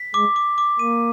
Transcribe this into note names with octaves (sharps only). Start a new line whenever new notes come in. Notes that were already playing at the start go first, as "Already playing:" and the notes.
Already playing: B6
G#3 D6
D6
D6
A#3 D#7